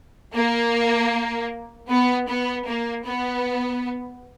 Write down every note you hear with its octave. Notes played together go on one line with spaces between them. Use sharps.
A#3
B3
B3
A#3
B3